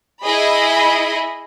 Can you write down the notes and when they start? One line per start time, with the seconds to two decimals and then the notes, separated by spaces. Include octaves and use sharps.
0.24 E4 G#4 D#5 B5